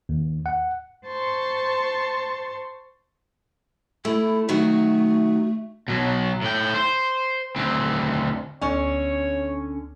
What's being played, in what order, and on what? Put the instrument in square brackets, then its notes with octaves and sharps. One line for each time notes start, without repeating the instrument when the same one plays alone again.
[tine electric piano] D#2
F#5
[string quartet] C5 A5 C6 C#6
[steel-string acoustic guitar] A3 [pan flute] E4
[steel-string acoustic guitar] D#3 F#3 F#4 [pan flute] A3
[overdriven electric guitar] B2 F#3
A2 G5
C5
D2 C4
[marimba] D2 G#5 C#6 [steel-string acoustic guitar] D3 C#4 [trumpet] C#5